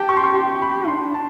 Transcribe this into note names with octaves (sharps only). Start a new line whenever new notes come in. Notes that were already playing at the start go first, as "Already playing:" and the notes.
Already playing: G4 A5
C#6
C6
C#6
G4 C6
B5
D4 C6
A5